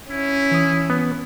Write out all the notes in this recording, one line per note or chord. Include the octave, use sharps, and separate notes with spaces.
C#4 E4
E3 D#6
B3